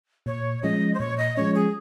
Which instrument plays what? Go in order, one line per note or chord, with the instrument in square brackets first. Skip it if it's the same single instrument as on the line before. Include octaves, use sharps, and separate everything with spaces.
[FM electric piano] A#2 [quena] C#5
[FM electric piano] F3 G#3 C#4 [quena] D#5
[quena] C5
[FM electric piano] A#2 [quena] C#5
[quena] D#5
[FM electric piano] F3 G#3 C#4 [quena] C#5
[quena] G#4